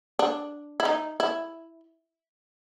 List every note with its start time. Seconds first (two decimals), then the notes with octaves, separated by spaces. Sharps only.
0.19 D4
0.80 E4
0.85 D#4
1.20 E4